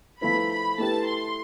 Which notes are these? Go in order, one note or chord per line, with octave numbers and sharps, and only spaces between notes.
F3 A3 E4 B4 B5
B5
A3 E4 G4 B4 A5
C6